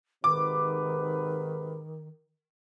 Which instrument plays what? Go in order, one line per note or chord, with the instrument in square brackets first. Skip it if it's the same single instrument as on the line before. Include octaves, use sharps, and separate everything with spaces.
[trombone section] G#2 C3 B4 [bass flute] D#3 [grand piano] D6